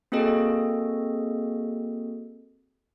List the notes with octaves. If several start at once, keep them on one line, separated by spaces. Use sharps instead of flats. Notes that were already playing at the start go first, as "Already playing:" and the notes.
A#3 C4 F#4 G#4 A4 D#5